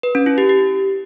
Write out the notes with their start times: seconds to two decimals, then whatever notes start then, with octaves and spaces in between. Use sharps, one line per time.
0.03 B4
0.15 C#4
0.26 E4
0.38 G4
0.49 G4